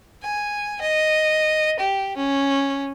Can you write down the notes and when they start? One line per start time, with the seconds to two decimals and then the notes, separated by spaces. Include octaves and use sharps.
0.22 G#5
0.81 D#5
1.79 G4
2.17 C#4